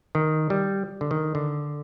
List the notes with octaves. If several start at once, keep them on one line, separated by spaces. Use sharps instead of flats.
D#3
G3
D3
D#3
D3